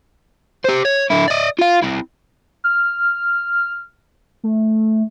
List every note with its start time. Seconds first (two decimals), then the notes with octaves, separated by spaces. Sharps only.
0.65 G4 C5
0.85 C#5
1.10 D3 E4
1.28 D5 D#5
1.59 F4 F5
1.83 C4 E4
2.64 F6
4.44 A3